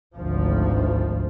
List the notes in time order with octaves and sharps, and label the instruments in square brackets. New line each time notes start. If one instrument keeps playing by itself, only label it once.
[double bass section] G#1 D2 F3